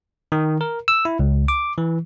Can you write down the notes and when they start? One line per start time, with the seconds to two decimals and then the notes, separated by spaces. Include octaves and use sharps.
0.32 D#3
0.61 A#4
0.88 E6
1.05 E4
1.19 C#2
1.48 D6
1.78 E3